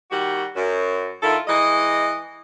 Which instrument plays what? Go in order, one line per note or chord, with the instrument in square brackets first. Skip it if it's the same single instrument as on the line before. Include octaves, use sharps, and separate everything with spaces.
[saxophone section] D#3 G3 F#4
F#2
D#3 E4 F4 A4
E3 G#3 D#5